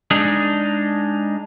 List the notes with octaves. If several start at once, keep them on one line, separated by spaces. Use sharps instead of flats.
G#3 D4 D#4